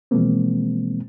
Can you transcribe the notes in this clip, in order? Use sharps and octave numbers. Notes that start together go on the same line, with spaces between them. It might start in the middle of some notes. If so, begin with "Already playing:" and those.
B2 E3 F3 G#3 A#3 C4